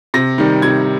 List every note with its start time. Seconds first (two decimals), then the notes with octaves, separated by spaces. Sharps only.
0.14 C3 A#6
0.38 D#3 G3
0.62 C3 G#6